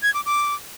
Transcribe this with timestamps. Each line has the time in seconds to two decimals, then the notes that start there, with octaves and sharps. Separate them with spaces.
0.03 G#6
0.14 D6
0.26 D6